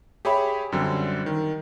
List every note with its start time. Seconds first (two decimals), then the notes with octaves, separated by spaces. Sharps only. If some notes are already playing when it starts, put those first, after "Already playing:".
0.25 G4 G#4 C#5 E5 B5
0.72 F#2 D3 G3 C4
1.26 D#3